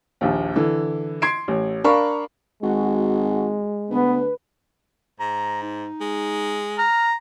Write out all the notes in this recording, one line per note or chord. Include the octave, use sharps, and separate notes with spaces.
A#1 D#2
D3 E3
C6 G#6 C7 D7
A1
D4 A#4 F5 B5 C#6
G#1 G#3 F#4
D2 B3 B4
G#2 A#5
D#4
G#3
A#5 F6